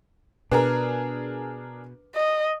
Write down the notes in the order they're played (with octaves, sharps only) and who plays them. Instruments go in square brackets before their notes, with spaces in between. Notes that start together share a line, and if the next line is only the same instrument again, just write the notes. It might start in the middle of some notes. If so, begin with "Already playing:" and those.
[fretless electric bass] B2 [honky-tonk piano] D4 G#4 A#4 [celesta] B4
[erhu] D#5